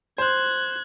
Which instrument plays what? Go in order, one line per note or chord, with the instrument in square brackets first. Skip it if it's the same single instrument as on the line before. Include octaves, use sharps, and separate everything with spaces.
[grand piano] C5 [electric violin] F#6 G#6